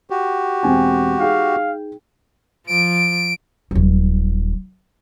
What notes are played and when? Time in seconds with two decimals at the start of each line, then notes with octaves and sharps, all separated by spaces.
0.10 F#4 G4
0.63 E1 C4 G#5
1.20 D#4 G#4 F5 G5
2.67 F3 D7
3.71 D#1 F#3